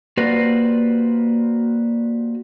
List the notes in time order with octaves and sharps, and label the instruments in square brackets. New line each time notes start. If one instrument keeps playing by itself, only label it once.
[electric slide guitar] A#3 F#4 G4 B4 C5 D5